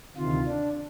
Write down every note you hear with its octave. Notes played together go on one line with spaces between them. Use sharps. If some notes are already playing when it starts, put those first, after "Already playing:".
D2 C3 D#3 F4
D4